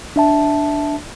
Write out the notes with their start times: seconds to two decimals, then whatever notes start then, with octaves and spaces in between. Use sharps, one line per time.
0.16 D4 E5 A5